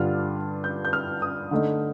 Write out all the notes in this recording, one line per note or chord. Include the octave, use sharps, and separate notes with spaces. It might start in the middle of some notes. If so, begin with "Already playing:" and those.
Already playing: G2 D3 G3 D4 F4 F6
G6
G6
F6
D#6
D3 A3 D#4